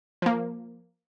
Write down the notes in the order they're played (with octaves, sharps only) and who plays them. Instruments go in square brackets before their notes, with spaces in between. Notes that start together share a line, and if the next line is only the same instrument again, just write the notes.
[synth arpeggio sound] F3 A#3